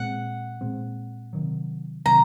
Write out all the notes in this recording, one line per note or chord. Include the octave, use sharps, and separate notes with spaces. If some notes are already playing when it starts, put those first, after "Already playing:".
Already playing: A#2 G#3 C4 F#5
A#2 G#3 C4
C3 D#3 F#3
C3 D#3 F#3 A#5